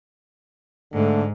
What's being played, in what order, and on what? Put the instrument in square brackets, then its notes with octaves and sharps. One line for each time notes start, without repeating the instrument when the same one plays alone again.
[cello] G#2 [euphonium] D3 [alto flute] A3